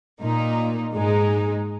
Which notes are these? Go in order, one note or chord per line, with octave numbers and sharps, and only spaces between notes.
A#2 A#3 D#4
G#2 G#3 D#4